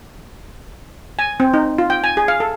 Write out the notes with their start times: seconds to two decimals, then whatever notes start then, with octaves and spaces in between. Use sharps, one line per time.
1.19 G#5
1.40 C4
1.54 D#4
1.78 F4
1.90 G5
2.04 G#5
2.17 G#4
2.28 F5
2.40 A4